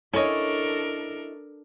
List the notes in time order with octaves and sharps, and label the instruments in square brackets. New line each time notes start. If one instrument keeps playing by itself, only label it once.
[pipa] C#4 C#5 [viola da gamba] D4 A4 A#4 [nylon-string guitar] E4 D#5